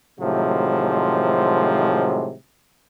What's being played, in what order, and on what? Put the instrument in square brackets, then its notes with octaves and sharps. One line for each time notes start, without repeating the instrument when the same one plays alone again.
[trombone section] A2 C3 D#3 F3 F#3 G#3